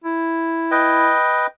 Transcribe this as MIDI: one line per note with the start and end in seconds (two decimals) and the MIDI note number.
0.04 1.14 64
0.71 1.47 71
0.71 1.47 75
0.71 1.47 79